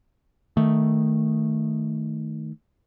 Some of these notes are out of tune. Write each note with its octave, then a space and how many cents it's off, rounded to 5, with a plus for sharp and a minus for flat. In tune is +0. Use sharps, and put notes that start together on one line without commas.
D#3 +0 A3 +0